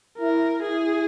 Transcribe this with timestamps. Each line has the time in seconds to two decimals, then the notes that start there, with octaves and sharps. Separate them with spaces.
0.18 E4 A#4
0.62 E4 G#4